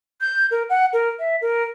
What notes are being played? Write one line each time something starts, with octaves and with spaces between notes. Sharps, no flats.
G6
A#4
F#5
A#4
E5
A#4